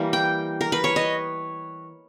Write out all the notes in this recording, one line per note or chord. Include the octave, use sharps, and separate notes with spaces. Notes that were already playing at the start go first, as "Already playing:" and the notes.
Already playing: E3 G3 A#3
G5
A#4
B4
C#5
D#5